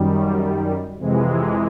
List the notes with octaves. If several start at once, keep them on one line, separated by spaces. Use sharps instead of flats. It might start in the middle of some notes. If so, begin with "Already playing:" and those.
Already playing: F#2 D#3 G3
F2 C3 E3 G#3